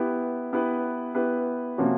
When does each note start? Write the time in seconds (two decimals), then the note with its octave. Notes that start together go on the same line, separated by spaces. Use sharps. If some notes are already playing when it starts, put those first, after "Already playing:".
Already playing: B3 E4 G4 B4
0.53 B3 E4 G4 B4
1.15 B3 E4 G4 B4
1.78 C3 F3 A#3 C#4 F#4